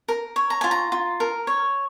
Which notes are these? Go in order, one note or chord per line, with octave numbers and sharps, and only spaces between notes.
A#4
C#5
A#5
F4 G#5
A#5
F4
A#4
C#5